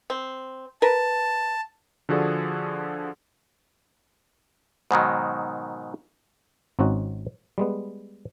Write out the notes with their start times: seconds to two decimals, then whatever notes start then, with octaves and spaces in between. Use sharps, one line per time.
0.10 C4
0.82 A#4 B4 A5
2.09 D3 F3 F#4 G#4 A4 D5
4.91 G#2 B2 D#3 F#3
6.79 G#1 C4 C#4 D#4 F#4
7.58 G3 G#3 B3